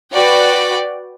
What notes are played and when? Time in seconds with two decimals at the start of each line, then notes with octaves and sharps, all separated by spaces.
0.14 F#4 B4 D5 G5